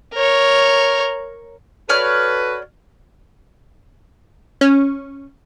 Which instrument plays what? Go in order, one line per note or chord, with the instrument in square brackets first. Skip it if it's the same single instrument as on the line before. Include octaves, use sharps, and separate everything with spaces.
[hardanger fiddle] A#4 C#5
[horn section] F#4 A4 B4 [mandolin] C#5 D5 F6
[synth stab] C#4